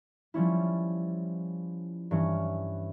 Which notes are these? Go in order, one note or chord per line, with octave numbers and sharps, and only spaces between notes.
F3 G3 C#4 E4
G2 E3 C#4